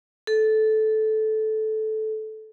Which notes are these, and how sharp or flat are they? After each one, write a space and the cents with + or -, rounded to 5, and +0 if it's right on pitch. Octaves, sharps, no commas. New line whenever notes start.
A4 -15